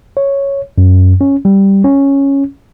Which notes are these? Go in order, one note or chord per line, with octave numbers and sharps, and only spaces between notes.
C#5
F#2
C#4
G3
C#4